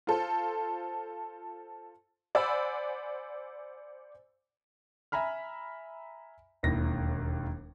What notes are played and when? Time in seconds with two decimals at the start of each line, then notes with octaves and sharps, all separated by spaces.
0.07 F4 A4 C5
2.35 C5 D5 F#5 G#5 B5 E6
5.12 E5 G#5 A#5 B5 F6
6.63 E1 D#2 E4 A#6